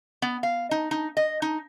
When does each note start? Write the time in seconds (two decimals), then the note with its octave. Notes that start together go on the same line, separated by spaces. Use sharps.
0.22 B3
0.43 F5
0.71 D#4
0.91 D#4
1.17 D#5
1.42 D#4